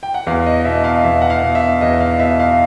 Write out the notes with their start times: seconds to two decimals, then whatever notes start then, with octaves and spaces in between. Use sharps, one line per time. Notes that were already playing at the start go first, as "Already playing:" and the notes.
0.03 G5
0.14 F#5
0.27 E2 F5
0.46 D#5
0.65 B2 E5
0.84 F5
1.04 E2 E5
1.22 F#5
1.30 F5
1.43 B2
1.55 E5
1.81 E2 D#5
2.00 F5
2.20 B2 E5
2.39 F5